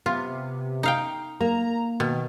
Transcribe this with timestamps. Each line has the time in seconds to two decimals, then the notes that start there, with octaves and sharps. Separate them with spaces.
0.06 C3 B3 F4
0.83 D#4 F5 G5
1.41 A#3 A#5
2.00 B2 D#3